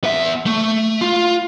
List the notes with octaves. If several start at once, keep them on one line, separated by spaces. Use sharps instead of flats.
B3 E5
A3
F4